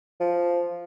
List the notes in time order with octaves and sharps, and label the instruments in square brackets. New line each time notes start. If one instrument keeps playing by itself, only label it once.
[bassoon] F3